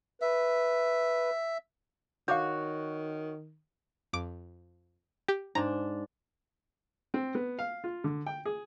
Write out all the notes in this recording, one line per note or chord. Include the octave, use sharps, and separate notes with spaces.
B4 E5
D#3 F#4 C#5 F5 D6 G6
F2 D6
G4
G#2 D4 A#5
C4
B3
F5
F4
D3
G5
G#4